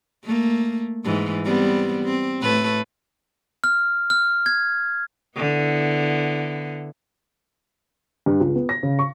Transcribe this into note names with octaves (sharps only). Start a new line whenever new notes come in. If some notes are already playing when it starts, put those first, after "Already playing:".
A3 A#3
G#2 E3
G3 B3 C4
C4
A2 A3 B4
F6
F6
G#6
D3 B3 E4
G2
C#2
B3
A#6
C#3
C#6